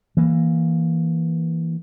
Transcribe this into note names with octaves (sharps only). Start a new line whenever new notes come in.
E3 A#3